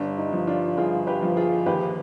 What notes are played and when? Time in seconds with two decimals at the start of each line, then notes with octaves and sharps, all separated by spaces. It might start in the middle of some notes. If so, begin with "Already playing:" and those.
Already playing: G1 D4
0.17 D#4
0.32 F3
0.47 D4 F4
0.77 G1 F4 G#4
1.07 G4 B4
1.23 F3
1.37 F4 G#4
1.66 D#2 G4 B4